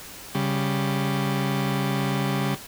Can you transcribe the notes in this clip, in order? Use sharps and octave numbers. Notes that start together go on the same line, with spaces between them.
C#3 G3